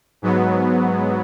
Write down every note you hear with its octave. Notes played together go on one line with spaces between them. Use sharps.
G#2 F#3 B3